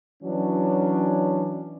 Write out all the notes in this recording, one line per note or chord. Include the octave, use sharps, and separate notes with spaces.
E3 F#3 C#4 D4